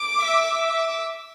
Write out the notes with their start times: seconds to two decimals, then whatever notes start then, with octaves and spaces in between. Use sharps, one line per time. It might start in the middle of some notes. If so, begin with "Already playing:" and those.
Already playing: D6
0.18 E5
0.66 E5